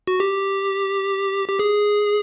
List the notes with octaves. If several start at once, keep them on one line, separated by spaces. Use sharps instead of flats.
F#4
G4
G4
G#4